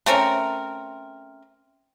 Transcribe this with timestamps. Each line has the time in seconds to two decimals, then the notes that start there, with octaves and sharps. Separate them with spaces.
0.06 A3 C4 C#4 A#4